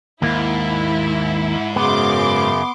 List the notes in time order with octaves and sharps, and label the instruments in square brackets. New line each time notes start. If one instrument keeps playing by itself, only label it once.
[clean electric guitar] D#2 A#3 [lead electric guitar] G#2 [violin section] E4
[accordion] F#2 C#3 [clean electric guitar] B3 [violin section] C6 D6